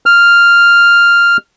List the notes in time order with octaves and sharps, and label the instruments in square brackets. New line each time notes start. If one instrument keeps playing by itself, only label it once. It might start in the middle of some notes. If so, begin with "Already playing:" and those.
[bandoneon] F6